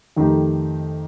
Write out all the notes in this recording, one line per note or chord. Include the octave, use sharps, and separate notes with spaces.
F2 D#3 A3 D#4 G4